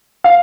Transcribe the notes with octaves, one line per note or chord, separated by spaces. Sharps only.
F5